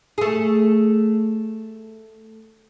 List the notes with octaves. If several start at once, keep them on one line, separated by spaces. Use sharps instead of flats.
A3 G#4